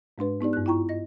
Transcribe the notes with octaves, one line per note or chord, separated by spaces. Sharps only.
G#2 G#3 D4 B4
B3 D#4 G4 D5
G2 F#6
E4 F4 G5 A#5 C#6
D#5 A#6